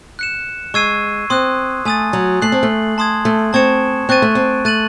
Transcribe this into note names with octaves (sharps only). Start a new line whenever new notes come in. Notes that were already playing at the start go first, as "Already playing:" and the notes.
F#6 C#7 E7
G#3 C#6 E6 G#6 C7 D#7
C4 C6 D#6 F#6
A3 G#5 D#6 A6
F#3
A3 F#6 C7 F#7
C4
A3
A5 C6 D#6 G#6
A3
C4 A5 C#6 G#6 C#7 E7
C4 C#6 F#6 A6 D#7
A3
C4
A3 F#6 A6 D#7 F#7